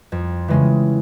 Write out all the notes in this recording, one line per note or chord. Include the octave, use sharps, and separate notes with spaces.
F2
C#3 E3 G#3 C#4